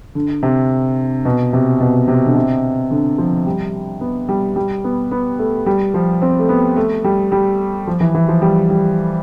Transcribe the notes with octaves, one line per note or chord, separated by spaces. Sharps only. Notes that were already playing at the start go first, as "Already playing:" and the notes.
D3
C3
B2
C3
B2
C3
D3
C3
D3
F3
G3
B3
G3
G3
B3
B3
A3
G3
F3
C4
A3
B3
A3
G3
G3
F3
E3
E3
F3
G3
G3